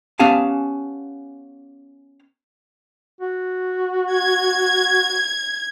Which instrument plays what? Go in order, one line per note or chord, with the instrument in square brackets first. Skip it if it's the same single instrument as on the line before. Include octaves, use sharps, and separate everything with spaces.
[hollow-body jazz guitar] B3 C#4 G4 F5 G#5 A5
[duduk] F#4
[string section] G#6